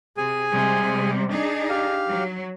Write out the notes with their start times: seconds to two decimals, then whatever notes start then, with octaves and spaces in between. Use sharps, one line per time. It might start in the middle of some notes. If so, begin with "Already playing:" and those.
0.17 C3 G#4 G#5
0.52 C3 G3 G#3
1.32 D4 D#4 G#4
1.70 G4 F5
2.08 F#3